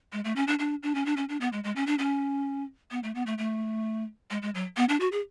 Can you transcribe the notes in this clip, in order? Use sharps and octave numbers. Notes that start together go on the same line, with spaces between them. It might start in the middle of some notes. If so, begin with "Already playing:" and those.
G#3
A3
C#4
D4
D4
D4
C#4
D4
C#4
D4
B3
G#3
G#3
C#4
D4
C#4
B3
A3
B3
A3
A3
G#3
G#3
F#3
B3
D4
F#4
G#4